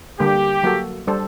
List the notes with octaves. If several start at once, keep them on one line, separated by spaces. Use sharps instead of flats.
D3 G3 A#3 G4
F#3 A#3 F#4 A4
G3 D4 A4 C5